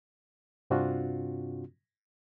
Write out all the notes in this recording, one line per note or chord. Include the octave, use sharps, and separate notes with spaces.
G2 C3 C4 D4 F4 F#4